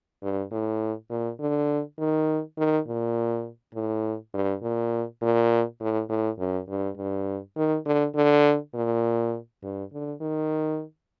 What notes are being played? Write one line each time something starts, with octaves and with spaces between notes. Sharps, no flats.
G2
A2
A#2
D3
D#3
D#3
A#2
A2
G2
A#2
A#2
A2
A2
F#2
G2
G2
D#3
D3
D3
A#2
G2
D3
D#3